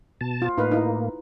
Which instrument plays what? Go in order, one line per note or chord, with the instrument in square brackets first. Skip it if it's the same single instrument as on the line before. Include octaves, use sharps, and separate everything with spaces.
[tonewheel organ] B2 A5
[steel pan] F4
[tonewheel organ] A2 A#3 [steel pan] D#4 B4 F5
[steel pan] D#4 E4